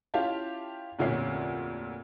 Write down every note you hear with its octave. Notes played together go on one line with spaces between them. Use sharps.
C#4 E4 F4 G4 F5 A5
F1 D2 A#2 C#4 E5 C7